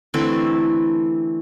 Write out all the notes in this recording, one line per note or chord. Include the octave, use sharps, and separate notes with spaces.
D3 E3 A3 C4